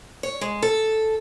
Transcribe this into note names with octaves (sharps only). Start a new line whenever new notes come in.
C#5
G#3
A4